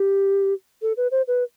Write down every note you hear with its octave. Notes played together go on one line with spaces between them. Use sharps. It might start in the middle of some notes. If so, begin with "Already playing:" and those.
Already playing: G4
A4
B4
C5
B4